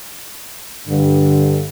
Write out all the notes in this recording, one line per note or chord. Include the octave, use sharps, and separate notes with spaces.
G2 D3